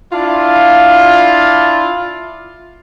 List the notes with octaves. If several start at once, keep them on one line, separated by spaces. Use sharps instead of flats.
D4 E4 F4